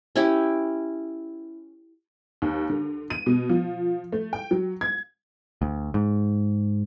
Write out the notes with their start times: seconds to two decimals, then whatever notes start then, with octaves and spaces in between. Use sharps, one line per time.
0.16 C#4 E4 G4
2.42 D#2
2.70 D3
3.10 D#7
3.26 B2
3.50 F3
4.12 A3
4.33 G5
4.51 F#3
4.81 G#6
5.62 D2
5.94 G#2